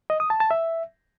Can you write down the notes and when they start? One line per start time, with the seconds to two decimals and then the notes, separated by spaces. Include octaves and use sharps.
0.10 D#5
0.20 D#6
0.30 A5
0.40 A5
0.51 E5